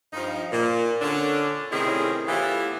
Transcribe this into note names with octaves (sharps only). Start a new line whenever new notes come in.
G2 F3 D#4
A#2
D3 C#4 D4
A2 C3 D#3 C#4 E4 G#4
A2 E3 B3 E4 F4 G4